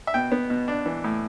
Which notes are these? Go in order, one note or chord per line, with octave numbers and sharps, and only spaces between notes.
E5
B2 G5
B3
B2
D4
E3
A2